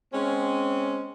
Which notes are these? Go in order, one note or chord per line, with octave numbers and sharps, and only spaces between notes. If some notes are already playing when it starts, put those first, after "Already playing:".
G#3 C4 C#4